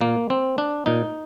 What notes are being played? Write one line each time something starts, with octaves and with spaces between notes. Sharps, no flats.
A#2 A#3
C4
D4
A#2 D#4